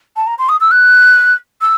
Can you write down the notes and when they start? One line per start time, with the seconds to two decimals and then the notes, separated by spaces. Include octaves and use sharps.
0.16 A5
0.27 A#5
0.39 C6
0.49 D#6
0.61 E6
0.71 F#6
1.61 E6